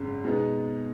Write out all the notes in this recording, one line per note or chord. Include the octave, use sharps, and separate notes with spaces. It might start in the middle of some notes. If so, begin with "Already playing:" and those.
Already playing: G#1 F#2 C#3
B2 G#3 B3 D#4